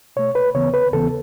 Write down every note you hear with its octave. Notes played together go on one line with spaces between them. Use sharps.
B2 A3 C#5
B4
D#2 C#3 E3 B3 C#5
B4
D#2 C#3 E3 B3 A4